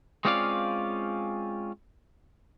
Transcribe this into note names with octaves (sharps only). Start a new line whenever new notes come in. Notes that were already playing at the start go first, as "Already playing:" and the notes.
G#3 C4 C#4 F4 D5 F5